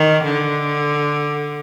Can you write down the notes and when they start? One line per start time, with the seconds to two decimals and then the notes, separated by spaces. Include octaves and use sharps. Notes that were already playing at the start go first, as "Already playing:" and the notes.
Already playing: D#3
0.24 D3